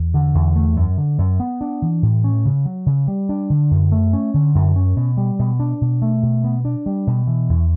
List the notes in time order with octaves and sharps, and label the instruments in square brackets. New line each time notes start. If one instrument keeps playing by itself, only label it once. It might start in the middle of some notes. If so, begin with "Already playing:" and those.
Already playing: [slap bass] E2
D3
E2
A3
F#2
D3
F#2
B3
D4
E3
A2
C#4
C#3
F#3
C#3
G3
D4
D3
F#2
A3
C#4
D3
F#2
C#4
B2
G3
B2
D4
B2
A3
B2
B3
D4
G3
B2
E3
E2